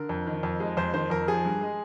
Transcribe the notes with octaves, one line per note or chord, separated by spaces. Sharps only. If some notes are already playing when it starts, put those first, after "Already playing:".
Already playing: D3 A#4
F2
D#3
F2
G#3
F2 C5
D#3 C5
F2 A#4
F3 G#4
G2
G#3